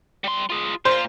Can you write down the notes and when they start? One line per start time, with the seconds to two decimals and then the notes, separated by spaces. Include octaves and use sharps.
0.24 G3 C6
0.50 F4 G#4
0.85 A#2 F4 C5